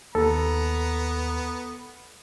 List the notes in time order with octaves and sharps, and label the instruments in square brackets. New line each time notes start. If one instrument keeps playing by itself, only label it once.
[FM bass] D#2 [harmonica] B3 [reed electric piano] A4 [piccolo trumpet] A#5